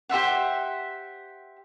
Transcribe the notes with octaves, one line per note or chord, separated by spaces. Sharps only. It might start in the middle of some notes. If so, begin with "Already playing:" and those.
G4 C5 E5 F#5